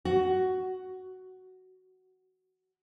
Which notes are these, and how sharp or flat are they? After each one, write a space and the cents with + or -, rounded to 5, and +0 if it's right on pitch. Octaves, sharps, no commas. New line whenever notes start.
F#4 +10